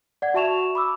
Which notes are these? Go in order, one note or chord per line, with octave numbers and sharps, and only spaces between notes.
D5 F#5 G#6
F#4 E5 A5 C#6 E7 F7
B5 D6 E6